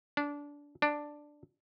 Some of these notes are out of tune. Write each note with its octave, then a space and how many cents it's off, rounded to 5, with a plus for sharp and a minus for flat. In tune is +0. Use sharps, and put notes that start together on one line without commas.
D4 -20
D4 +5